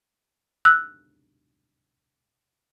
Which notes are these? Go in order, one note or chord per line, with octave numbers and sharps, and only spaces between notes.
E6 F#6